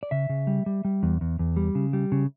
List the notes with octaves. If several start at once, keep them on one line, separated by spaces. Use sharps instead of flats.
D5
C#3 E5
C#3
G3
G3
G3
E2
E2
E2
G3
C#3
G3
C#3